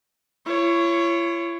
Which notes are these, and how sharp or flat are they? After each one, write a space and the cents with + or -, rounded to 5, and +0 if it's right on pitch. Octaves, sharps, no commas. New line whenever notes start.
E4 +45 C#5 +0